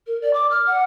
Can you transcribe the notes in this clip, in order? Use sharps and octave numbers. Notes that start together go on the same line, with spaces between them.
A#4
D5
D6
F6
F#5